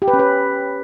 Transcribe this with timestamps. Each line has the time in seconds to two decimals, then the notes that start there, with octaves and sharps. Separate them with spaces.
0.02 G4
0.08 B4
0.13 C#4
0.19 B4